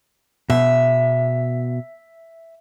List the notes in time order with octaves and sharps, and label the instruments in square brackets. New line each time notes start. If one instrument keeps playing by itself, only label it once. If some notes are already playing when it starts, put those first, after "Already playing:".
[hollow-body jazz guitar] B2 [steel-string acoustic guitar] E5